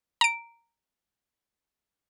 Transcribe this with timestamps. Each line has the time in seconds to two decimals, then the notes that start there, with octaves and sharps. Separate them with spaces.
0.21 A#5 D7